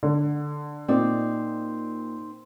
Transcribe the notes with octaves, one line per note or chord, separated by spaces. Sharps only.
D3
A#2 C4 D#4 D5